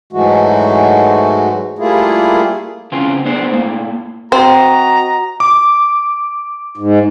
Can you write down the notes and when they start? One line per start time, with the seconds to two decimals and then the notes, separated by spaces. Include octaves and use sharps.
0.13 G#2 E3 F#3 G#3 A3 F#4
1.79 G3 A3 A#3 E4 F4 G#4
2.92 C#3 E3 C4 F4 G#4
3.25 B3 D4 G#4 C5
3.51 A2 A#3
4.32 C4 F#4 D#5 A#5
5.40 D6
6.77 G#2